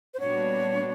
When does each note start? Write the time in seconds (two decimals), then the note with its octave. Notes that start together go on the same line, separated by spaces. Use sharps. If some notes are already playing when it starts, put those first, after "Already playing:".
0.14 C5
0.20 A#2 G3 B3 D4 F#4 C#5